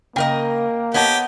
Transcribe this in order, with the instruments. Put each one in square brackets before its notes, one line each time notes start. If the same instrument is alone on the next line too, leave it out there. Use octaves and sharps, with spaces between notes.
[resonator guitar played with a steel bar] C#3 A#4 D#5 [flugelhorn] A#3 [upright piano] G5
[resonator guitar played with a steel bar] B3 C#5 D#5 [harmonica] G4 [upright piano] F#5 A5